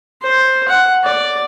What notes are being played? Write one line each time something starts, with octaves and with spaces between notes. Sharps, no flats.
C5
F#5
D5